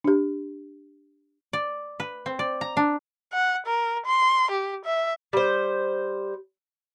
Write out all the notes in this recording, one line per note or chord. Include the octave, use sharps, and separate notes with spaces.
D4 G4
D5
B4
C4
D5
A#5
D4
F#5
A#4
C6
G4
E5
G3 C5